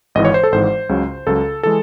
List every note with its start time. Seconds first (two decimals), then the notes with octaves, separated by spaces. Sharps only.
0.15 G#1 G#2 E3 D#5
0.25 C#5
0.34 C5
0.44 A4
0.52 G#1 G#2 E3 C5
0.89 C#2 C#3 F#3
1.27 C#2 C#3 F#3 A4
1.63 E3 G#3 A4